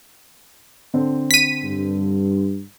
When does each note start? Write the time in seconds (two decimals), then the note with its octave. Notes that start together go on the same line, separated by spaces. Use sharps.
0.94 D3 C4
1.31 B6 D#7
1.63 G2